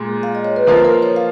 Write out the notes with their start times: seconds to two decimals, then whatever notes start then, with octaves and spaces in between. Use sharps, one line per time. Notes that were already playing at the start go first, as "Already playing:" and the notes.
Already playing: A#2 G#3
0.23 F5
0.35 D#5
0.45 C#5
0.56 B4
0.67 F3 A#3 F4 A#4
0.85 A#4
1.02 C#5
1.16 F5